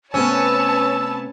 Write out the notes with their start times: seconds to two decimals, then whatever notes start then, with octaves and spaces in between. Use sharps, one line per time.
0.14 C3 A3 B3 C#4 B4 C#5 A5 E6